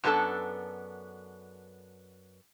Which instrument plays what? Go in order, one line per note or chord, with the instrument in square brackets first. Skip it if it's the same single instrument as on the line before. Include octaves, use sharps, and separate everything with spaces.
[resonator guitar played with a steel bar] F#2 G3 B3 D4 A4 A5